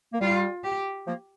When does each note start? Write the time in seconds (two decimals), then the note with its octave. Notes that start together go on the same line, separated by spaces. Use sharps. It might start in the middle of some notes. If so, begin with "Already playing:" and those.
0.14 A#3
0.21 G3 F4
0.64 G4
1.07 F3 A#3